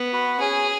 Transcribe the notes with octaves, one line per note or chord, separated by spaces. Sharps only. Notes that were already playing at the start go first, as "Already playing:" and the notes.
Already playing: B3
F#4 B4
C#4 G#4